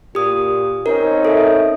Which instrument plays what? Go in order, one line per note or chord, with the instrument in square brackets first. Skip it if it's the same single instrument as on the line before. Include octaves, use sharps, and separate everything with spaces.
[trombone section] A#2 [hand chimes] G4 D#6
[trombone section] C4 C#4 D#4 [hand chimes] A#4
[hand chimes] A4 E5